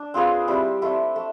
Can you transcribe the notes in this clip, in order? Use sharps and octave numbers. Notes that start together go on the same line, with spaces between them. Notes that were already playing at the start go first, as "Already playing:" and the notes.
Already playing: D4
C4 F4 G#4 B4
G3 C4 E4
A3 C4 E4
A3